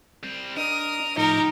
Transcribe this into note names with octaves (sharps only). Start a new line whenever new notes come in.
G3 C4
D4 A#4 D#5 D#6
A2 F3 D#4 G4 A#4